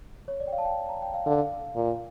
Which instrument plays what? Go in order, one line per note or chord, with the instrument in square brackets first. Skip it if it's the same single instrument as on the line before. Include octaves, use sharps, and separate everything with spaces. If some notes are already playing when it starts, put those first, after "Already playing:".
[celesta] C#5
D5
G5
F5
A5
G5
A#5
G5
F5
[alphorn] D3 [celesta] F5
[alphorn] A#2